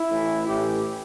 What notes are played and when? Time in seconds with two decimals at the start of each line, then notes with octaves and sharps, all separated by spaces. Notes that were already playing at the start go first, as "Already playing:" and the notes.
Already playing: E4
0.10 A1 A2 E3
0.47 A1 A2 E3 G4